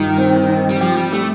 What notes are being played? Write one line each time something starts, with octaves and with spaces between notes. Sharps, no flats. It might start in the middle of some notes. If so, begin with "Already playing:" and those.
Already playing: G2 D#3 F4
C4
C4
G3
F3 G4
G3
G3 A3